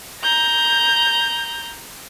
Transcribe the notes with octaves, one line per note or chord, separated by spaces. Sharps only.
A#5 G6